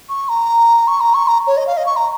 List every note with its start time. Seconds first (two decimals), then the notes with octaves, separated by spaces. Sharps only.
0.09 C#6
0.28 A#5
0.87 C#6
1.00 A#5
1.14 C#6
1.27 A#5
1.47 C#5
1.57 D#5
1.66 F5
1.77 D#5
1.86 C#6
1.96 A#5